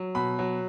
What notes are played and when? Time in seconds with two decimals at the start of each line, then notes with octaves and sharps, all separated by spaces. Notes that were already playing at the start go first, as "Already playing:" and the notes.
Already playing: F#3
0.15 B2 B5
0.39 F#3